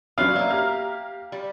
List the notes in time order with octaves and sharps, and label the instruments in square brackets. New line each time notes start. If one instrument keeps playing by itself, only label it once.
[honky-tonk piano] F#3 C#4 F4 [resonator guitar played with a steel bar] B3 D4 [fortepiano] F5
[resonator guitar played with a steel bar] A#3 E5 [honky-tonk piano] D5
[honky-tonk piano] G4 A#5 F6
[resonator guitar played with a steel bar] G3